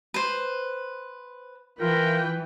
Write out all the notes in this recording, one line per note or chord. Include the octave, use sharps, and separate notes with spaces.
B4 C5
E3 F4 A#4 B4 G5